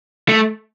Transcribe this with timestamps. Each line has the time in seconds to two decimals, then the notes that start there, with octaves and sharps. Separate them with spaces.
0.29 A3